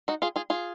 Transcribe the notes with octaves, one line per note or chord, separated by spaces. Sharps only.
D#4 F#4
F4 G#4
F4 G#4
F4 G#4